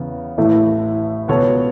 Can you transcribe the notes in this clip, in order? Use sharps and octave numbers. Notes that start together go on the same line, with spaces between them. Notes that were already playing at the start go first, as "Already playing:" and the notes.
Already playing: E2 C#3 E3 B3
A1 A2 E3 A3 E4
C#2 B2 B3 A4 C#5